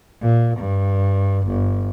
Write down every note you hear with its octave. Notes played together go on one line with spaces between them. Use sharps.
A#2
G2
G1